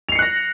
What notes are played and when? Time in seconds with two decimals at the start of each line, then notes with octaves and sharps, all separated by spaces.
0.09 F7
0.12 C7
0.15 C#7
0.19 F#6
0.22 A#6